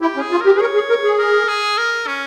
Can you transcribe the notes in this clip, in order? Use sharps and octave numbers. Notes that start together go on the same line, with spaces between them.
E4 G4
C#4
G#4
F4
G4 A#4
G#4
A#4 C#5
G#4
A#4
G#4
A#4
G#4
A#4
C#4